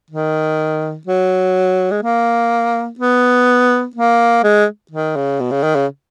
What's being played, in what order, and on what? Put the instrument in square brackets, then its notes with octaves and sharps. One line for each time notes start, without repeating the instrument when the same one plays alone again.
[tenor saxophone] D#3
F#3
G#3
A#3
B3
A#3
G#3
D#3
C#3
B2
C#3
D#3
C#3